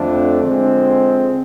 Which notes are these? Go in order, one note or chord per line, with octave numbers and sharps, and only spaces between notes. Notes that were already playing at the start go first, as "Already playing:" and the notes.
Already playing: F2 D3 F3 A3 D4
D3 F3 G#3 C4